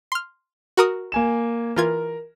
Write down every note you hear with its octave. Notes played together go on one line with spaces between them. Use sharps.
C6 F6
F#4 A#4 D#6
A#3 G#5 E7
E3 F4 A#4 G#6